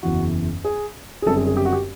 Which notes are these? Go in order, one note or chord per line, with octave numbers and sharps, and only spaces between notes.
F#1 E2 C#3 E3 F#4
G#4
G#4
F#1 F#2 D3 G3 C4 A4
G#4
G#4
G4
F#4
G4